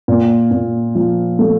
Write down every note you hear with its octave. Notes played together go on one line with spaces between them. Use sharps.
A#2
A#2
F3
A3